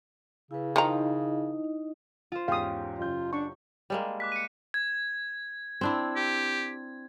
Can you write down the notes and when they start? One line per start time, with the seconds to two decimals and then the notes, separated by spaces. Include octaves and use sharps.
0.51 C#3 E4 B4
0.76 D#3 F3 D#4 E4 D#5 A#5
2.32 F4 C5
2.48 E2 G#2 C#4 G4 F5 D#6
2.99 F#1 F#2 F4 G6
3.33 D4 C#6
3.90 G3 G#3 A#3
4.20 D6 F#6 B6
4.32 C#7 D#7
4.74 G#6
5.81 C4 D4 E4
6.16 G4